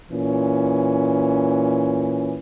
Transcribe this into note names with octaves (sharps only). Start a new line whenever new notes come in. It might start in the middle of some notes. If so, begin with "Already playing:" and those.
A#2 E3 C#4